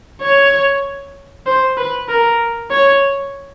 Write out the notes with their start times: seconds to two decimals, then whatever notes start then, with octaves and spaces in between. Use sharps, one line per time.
0.21 C#5
1.46 C5
1.77 B4
2.08 A#4
2.71 C#5